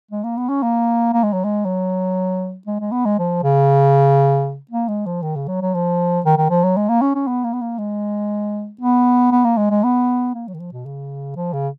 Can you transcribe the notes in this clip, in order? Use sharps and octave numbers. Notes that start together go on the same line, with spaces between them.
G#3
A#3
B3
C#4
A#3
A#3
G#3
F#3
G#3
F#3
G#3
G#3
B3
G#3
F3
C#3
A#3
G#3
F3
D#3
C#3
F#3
F#3
F3
D#3
D#3
F3
F#3
G#3
A#3
C#4
C#4
B3
A#3
B3
A#3
G#3
B3
B3
A#3
G#3
G#3
B3
A#3
F#3
D#3
F3
B2
C#3
F3
C#3